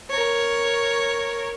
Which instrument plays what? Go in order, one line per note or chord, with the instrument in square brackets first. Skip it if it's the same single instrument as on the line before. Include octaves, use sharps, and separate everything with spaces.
[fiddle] A#4 C#5